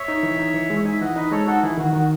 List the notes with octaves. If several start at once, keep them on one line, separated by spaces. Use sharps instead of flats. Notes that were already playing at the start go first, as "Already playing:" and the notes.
Already playing: C#5 E5
D#4
E3
D#4
E3
G#3
D#4 E5 G#5
E3 D#5 F#5
D#4 B4 D#5
G#3 A4 C#5
D#4 F#4 A4
E3 E4 G#4
D#3 F#4
D#3 F#4